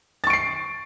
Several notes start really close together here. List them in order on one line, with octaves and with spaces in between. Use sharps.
A6 C#6 D7 C7